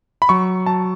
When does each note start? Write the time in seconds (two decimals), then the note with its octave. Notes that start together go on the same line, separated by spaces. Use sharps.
0.22 B5
0.29 F#3 C#6
0.66 F#3 A5